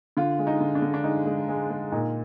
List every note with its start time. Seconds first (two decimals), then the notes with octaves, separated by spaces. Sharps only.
0.17 D3 F4
0.39 G#3
0.47 D#4
0.60 D3
0.75 D4
0.82 D3
0.94 D4
1.04 G#3 D#4
1.26 G#3
1.49 G#3
1.70 G#3
1.92 A#2 D#4